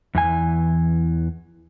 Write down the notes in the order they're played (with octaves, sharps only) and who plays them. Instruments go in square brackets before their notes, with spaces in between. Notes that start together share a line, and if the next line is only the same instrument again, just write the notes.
[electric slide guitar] E2 E3 G#5